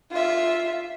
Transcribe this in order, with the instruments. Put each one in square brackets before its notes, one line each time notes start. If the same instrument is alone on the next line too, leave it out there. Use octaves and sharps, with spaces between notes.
[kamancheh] F4 E5